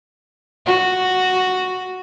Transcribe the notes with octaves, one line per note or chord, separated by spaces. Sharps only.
F#4